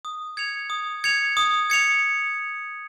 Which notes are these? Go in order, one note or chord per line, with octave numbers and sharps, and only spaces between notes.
D#6
G#6 C#7 F7
D#6
G#6 C#7 F7
D#6
G#6 C#7 F7